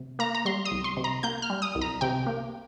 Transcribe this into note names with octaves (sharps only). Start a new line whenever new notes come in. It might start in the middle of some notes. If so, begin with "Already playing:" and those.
Already playing: C3
A#3 A#5
A#5
G3 C6
D#6
C2
C6
C3
A#5
A#3 G6
F6
G3
D#6
C2
A#5
C3 G5
A#3